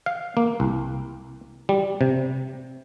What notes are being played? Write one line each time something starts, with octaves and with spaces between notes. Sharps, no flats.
F5
A#3
C2
G3
C3